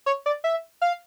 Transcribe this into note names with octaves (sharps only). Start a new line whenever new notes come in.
C#5
D5
E5
F5